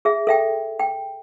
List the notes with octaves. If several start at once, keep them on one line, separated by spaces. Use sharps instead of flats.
G#4 E5
A4 E5 G5
G5